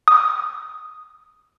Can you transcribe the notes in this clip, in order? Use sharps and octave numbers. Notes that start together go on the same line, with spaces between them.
D#6